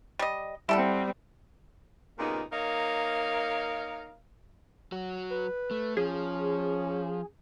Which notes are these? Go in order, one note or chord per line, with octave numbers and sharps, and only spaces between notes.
G3 D#5
G3 C4 E4 A4 F#5
A#2 C#3 G3 A#3 B3 D#4
A#3 D#4 A#4 C#5 D#5 F5
F#3 F#4
B4
A3
F3 C#4 G#4